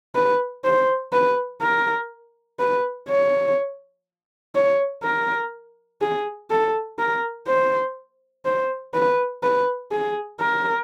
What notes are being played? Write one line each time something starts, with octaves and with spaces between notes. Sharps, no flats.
B4
C5
B4
A#4
B4
C#5
C#5
A#4
G#4
A4
A#4
C5
C5
B4
B4
G#4
A#4